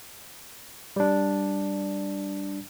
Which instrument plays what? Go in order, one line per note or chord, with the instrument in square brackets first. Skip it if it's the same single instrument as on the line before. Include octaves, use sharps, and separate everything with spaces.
[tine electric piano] G3 D4